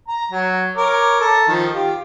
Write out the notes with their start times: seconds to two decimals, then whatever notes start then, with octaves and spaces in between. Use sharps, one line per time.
0.08 A#5
0.32 F#3
0.77 A#4 C#5 D6
1.21 A4 A#5
1.48 D#3 F3
1.74 F4 G4